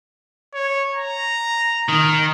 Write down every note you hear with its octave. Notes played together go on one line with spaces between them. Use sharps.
C#5
A#5
D#3